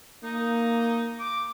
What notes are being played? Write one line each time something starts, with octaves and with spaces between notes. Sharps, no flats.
A#3 D#4
D6